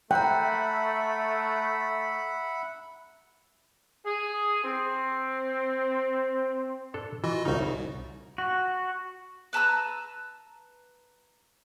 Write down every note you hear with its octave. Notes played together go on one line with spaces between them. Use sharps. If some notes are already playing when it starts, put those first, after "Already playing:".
A3 E5 F#5 G5 A#5 B5 F#6
G#4
C4
D4 A4
E3 F4 F#4 D#5
C2 C#3 D#4 F#4
C2 C#5
F#4
B4 A5 A#5 E6